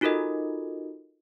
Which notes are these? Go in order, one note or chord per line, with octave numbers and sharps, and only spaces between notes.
D#4 F4 F#4 A4 A#4 D#5